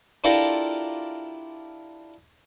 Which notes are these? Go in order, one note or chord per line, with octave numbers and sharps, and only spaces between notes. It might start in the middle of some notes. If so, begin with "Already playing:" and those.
D4 E4 F4 G4 A4 A#4